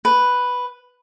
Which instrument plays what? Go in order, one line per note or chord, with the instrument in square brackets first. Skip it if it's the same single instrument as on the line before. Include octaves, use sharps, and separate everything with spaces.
[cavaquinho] B4